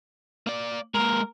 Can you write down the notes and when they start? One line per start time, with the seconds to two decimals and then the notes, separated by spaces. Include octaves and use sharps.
0.47 A#3 D5
0.94 G#3 A#3 A#4